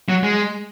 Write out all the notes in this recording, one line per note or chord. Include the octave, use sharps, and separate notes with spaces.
F#3
G#3